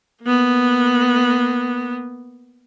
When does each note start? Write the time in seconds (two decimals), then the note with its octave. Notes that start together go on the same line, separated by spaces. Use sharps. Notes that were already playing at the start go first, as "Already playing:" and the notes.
0.23 A#3 B3